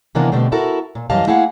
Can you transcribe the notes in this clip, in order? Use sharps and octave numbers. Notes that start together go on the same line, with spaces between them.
C3 D#3 E3 A#3 B3 D4
B2 D3 G3 A3 C4
E4 F#4 A4 A#4
A#2
F#2 E3 G3 D#5 F5 A5
A3 A#3 E4 G#4 F5 F#5